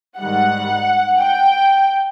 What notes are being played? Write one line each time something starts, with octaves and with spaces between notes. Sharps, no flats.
G#2 D#3 G3 F#5
G5